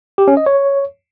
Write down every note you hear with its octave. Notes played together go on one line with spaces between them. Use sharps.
G4
C#4
D#5
C#5